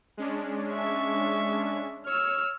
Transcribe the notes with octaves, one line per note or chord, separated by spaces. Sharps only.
G#3 C#4 D4
E5 C#6
C#5 E6 F6